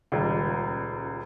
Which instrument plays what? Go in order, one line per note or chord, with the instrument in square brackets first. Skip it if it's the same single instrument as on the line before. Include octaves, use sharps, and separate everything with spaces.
[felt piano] D#1 C#2